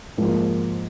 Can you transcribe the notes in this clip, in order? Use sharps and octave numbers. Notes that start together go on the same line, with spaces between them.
G#2 F3 A#3